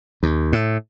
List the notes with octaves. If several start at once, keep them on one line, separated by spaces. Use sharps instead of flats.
D#2
A2